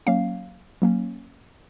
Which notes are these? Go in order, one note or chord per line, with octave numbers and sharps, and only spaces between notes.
F#3 A#3 C#4 F5
F#3 A#3 C#4